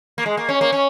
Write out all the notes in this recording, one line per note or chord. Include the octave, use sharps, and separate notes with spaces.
A#3
G#3
A#3
C#4
A#3
C#4